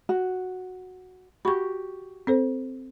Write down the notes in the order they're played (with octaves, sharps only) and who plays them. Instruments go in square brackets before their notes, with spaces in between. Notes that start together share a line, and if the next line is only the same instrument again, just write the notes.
[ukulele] F#4
[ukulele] F#4 G4 [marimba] B5 C#6
[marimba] C4 A4 C5